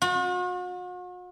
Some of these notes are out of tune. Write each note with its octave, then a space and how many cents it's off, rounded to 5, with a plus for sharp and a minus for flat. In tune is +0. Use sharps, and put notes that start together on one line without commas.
F#4 -45